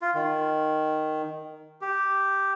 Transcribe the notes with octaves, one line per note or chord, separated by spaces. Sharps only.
F4
D#3
G4